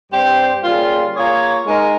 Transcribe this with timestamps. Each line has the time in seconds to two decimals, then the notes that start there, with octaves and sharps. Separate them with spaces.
0.11 G2 G3 C4 G4 C5
0.63 C#3 G3 A#3 F4
1.15 A#3 F4 G#4 C#5
1.66 G#3 D#4 A#4